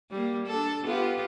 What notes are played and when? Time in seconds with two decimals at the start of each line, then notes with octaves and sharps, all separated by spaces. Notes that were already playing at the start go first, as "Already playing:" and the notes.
0.10 G3 A#3
0.46 D4 A4
0.85 B3 F4 G4